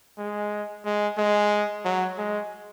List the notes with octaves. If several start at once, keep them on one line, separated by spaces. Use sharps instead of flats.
G#3
G#3
G#3
F#3
G#3